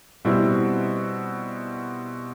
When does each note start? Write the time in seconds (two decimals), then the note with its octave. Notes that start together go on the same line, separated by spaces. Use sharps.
0.25 B2 G3 C4 E4